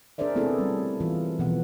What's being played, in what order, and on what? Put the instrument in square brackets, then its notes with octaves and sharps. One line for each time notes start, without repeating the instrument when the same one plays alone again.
[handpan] D4 G#4 A#4 C5 D5 E5
A3 B3 C4 E4 G#4 A4
G3 C#4
E3 F4
B2 E3 F3 B3 F#5